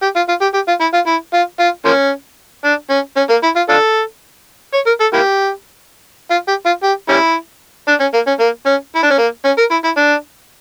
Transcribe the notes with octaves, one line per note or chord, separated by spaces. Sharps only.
G4
F4
F4
G4
G4
F4
E4
F4
E4
F4
F4
F3 A#3 C#4
D4
C#4
C#4
A#3
E4
F4
D4 F4 A4
C#5
A#4
A4
A#3 E4 G4
F4
G4
F4
G4
G3 C#4 E4
D4
C#4
A#3
C#4
A#3
C#4
E4
D4
C#4
A#3
C#4
A#4
E4
E4
D4